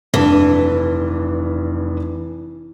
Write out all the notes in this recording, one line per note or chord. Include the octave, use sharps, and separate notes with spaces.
F1 G2 E3 A5